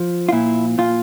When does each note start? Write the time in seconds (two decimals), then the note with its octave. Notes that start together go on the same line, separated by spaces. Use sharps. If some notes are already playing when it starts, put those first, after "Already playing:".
Already playing: F3
0.29 F4
0.32 A#2 E4
0.78 A#2 F4